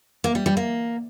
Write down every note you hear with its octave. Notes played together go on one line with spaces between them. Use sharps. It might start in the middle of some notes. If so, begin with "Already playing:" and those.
A#3
G3
G3
A#3